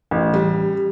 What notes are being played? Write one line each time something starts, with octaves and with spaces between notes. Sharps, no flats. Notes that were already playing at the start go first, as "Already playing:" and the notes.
A1
G3